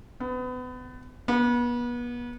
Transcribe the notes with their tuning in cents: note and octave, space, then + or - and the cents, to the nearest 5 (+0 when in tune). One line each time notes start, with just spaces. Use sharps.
B3 +30
B3 -35